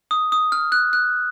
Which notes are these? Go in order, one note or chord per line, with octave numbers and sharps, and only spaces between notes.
D#6
D#6
F6
F#6
F#6